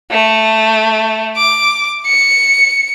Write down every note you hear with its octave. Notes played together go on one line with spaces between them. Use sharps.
A3
D6
C#7